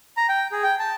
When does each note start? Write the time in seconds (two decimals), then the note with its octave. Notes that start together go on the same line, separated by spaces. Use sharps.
0.17 A#5
0.29 G5
0.52 G#4
0.63 G5
0.79 A5